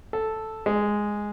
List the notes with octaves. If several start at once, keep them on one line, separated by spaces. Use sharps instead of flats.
A4
G#3